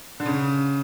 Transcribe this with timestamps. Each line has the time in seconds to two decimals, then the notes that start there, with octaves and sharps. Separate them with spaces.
0.20 D3
0.26 C#3